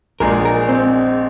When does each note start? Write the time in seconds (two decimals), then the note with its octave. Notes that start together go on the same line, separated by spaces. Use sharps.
0.20 A#1 A#2 G#3 D4 G#4 A#4
0.45 A#4
0.69 C4